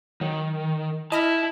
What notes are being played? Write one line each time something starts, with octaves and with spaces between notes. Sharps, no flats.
D#3 F#3
E4 D#5 A5 B5 F6